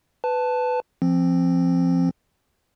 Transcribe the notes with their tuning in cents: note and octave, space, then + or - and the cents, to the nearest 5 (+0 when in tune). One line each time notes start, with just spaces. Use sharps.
B4 +15 A5 +0
F3 -20 C4 +10